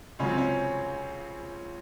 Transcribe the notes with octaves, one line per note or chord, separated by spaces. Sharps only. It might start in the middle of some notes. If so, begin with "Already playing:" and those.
C#2 C#3 F#3 C#4
C4
C#4